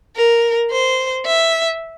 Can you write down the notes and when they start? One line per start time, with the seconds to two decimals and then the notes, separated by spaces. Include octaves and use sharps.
0.16 A#4
0.72 C5
1.26 E5